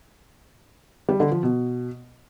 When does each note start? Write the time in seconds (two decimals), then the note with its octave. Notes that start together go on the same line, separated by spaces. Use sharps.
1.09 G3
1.20 D3
1.31 F3
1.43 B2